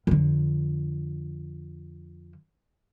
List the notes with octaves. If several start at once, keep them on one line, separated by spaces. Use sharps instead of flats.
F2 D3